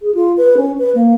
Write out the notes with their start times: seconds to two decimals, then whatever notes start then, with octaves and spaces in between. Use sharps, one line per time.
0.01 G#4
0.15 F4
0.37 B4
0.57 C#4
0.78 B4
0.95 A#3